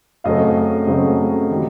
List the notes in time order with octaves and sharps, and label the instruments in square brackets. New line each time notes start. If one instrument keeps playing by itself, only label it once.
[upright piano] F#2 C#3 F#3 A3 C4 D#5 F5
F#2 C#3 F#3 A3 C4
D#3 G3